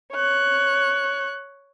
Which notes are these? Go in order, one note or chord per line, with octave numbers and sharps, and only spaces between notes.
C#5 F#6